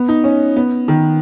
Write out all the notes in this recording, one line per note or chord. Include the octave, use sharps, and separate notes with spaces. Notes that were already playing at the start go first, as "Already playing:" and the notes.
Already playing: B3
D#4
C#4
B3
D#3